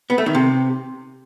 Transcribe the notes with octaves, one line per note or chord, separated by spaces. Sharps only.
B3
A3
D#3
C3